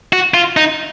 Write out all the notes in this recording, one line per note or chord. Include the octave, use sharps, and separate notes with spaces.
F#4
F4
D#4